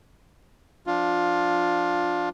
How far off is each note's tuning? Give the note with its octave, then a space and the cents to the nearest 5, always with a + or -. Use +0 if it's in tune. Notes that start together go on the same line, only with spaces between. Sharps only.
F3 +0 D4 +0 F4 +15